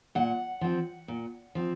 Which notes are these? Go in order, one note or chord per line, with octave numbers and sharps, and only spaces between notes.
A#2 F#5
F3 C4
A#2
F3 C4